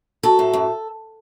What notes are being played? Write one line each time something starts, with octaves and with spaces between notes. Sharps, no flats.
F#3 A4
A2
F#2